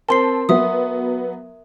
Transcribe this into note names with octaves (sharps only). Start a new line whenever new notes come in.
C4 A#4 A5 C6 C7
F#3 B3 E5 D#6